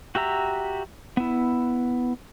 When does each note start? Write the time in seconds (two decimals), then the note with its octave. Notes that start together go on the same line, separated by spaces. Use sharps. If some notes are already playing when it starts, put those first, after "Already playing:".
0.15 F#4 G4 E5 A#5
1.17 B3 E4